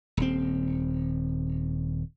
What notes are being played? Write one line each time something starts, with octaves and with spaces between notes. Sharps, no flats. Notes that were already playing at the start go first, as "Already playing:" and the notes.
D#1 C4